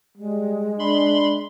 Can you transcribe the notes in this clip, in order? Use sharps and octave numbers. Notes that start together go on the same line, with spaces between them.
G3 G#3
D4 B5 C6